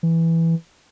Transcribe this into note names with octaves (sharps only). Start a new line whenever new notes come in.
E3